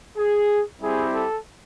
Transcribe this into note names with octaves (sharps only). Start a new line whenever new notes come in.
G#4
G3 C4 E4 G4 G#4
A4